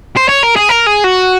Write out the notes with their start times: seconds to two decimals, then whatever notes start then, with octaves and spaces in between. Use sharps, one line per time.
0.17 C5
0.29 C#5
0.43 A#4
0.56 G#4
0.69 A#4
0.87 G#4
1.04 F#4